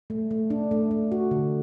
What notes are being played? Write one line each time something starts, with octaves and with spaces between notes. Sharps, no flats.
A3
A3
D4
A3
A3
F#4
D3